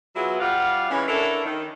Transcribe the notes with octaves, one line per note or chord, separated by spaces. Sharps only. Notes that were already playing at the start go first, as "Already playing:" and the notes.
F#3 B3 E4 F4 G#4
G3 F4 G4 F5 F#5
E3 G#3 C#4
D4 E4 A4 A#4 C#5
D#3